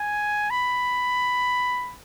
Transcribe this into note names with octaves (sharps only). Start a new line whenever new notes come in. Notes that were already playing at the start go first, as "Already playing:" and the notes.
Already playing: G#5
B5